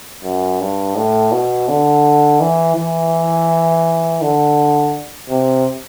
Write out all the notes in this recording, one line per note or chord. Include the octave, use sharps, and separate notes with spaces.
F#2
G2
A2
B2
D3
E3
E3
D3
C3